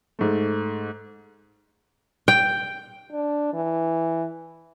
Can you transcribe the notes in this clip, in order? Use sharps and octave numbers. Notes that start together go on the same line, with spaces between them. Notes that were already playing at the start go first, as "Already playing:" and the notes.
G#2 A3
G5
D4
E3